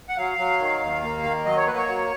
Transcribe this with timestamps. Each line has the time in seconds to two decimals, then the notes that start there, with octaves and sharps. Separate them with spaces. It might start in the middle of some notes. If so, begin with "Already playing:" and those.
0.09 F#5
0.17 F#3 F5
0.38 F#3
0.60 D#3
0.81 D#2
1.02 A#3
1.24 D#3
1.45 F#3 D#5
1.57 C#5
1.67 A#3 B4
1.77 C#5
1.88 F#3